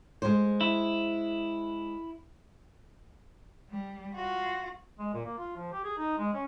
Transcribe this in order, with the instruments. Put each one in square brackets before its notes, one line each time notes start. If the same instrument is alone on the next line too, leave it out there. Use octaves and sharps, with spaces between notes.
[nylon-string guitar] G#3 C5
[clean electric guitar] E4
[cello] G3
F4 F#4
[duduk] G#3
A#2
A#3
F4
F3
G4
G#4
D#4
G#3
C#4